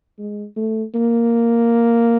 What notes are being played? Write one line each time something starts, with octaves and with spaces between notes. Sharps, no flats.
G#3
A3
A#3